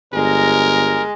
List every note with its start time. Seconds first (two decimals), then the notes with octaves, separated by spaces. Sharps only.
0.13 G1 G#3 A#4